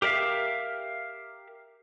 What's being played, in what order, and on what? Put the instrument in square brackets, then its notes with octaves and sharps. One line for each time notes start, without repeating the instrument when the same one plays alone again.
[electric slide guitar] G4 A#4 D5 E5 F5